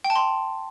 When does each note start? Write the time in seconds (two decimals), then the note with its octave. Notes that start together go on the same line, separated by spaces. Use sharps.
0.04 G5
0.10 A5
0.15 C6